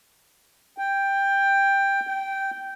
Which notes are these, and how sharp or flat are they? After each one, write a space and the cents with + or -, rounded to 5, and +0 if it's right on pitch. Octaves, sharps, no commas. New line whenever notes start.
G5 +10
G5 -10